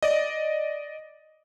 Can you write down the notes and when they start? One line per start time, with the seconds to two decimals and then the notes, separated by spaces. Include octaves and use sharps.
0.03 D5 D#5